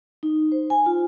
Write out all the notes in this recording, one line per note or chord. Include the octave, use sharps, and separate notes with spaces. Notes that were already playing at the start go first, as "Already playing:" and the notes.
D#4
C5
G#5
F4